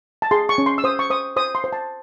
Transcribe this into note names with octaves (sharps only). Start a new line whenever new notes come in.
A5
G#4 C6
C#6
C#4
C6
E6
C5 D#6
C#6
C5 D#6
C5 D#6
C6
C5
A5